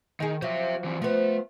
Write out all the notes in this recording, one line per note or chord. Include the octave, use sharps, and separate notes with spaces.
D#3 D#4 G#4
F3 F#3 C5 E5
E3 C4
F3 A3 B3